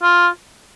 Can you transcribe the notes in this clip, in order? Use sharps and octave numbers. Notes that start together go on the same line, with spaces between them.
F4